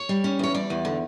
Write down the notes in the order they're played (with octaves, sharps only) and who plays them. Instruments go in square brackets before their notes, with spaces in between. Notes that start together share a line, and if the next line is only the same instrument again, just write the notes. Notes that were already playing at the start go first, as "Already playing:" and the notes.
Already playing: [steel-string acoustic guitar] C#5
G3
C#4
E2 C#5
G3 D5
E2
D3